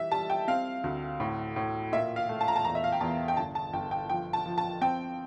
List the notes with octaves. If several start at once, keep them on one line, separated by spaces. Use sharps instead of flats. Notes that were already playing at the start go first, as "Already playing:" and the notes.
Already playing: E3 G3 E5
G3 A5
G5
C4 F5
D2
A2
A2
A#2 E5
F5
A3
A5
A#5
A5
E2 A#5
E5
F5
G5
E2 A5
G5
G1 A5
A5
G1 G5
G5
F3 G5
A5
F3
A5
C4 G5